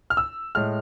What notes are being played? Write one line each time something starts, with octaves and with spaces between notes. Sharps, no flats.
F6
E6
A2 G#3 F6